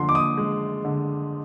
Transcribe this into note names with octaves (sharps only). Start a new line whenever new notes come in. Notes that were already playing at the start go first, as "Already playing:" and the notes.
Already playing: D3 F3 C6
D6
D#6
G#3
D3